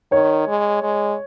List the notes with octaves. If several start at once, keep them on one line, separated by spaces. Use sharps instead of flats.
D#3 C#5
G#3
G#3